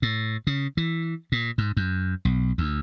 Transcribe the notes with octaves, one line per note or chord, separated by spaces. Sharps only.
A2
C#3
E3
A#2
G#2
F#2
B1
D2